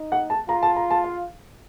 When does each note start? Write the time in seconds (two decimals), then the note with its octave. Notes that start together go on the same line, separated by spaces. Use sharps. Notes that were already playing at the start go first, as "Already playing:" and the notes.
Already playing: D#4
0.12 F#5
0.30 A5
0.48 F4 A#5
0.63 A5
0.76 A#5
0.90 A5
1.04 F5